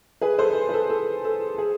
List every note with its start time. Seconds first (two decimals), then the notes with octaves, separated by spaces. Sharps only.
0.21 G#4 B4
0.38 A4 C5
0.69 B4
0.74 A4
0.90 A4
1.25 A4
1.58 G#4